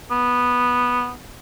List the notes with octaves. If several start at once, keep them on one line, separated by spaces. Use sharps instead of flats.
B3